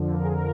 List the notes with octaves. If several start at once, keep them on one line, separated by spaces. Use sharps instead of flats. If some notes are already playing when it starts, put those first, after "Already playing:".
Already playing: F2 D3 F3
A#4
G#4
A#4